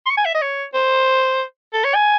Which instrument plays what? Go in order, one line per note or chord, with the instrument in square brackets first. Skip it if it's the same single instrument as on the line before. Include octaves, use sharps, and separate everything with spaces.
[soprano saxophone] C6
C#6
G#5
E5
D#5
C#5
C5
A4
C#5
G#5